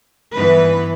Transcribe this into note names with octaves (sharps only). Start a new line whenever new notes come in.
G2 E3 B3 B4